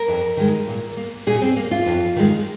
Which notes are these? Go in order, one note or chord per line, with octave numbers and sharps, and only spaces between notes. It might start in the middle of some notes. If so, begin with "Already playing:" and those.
Already playing: A#4
F2
D#3 G#3
A#2
A#3
A#2 G#4
C4
A#3
F4
F2
D#3 G#3